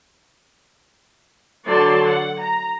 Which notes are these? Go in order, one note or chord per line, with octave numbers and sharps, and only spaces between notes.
D3 F#3 D5 A5 C6
F#5
A#5